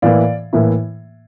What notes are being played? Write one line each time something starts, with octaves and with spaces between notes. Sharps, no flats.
A2 E3 A#3 E4 D5 F5
A2 E3 A#3 E4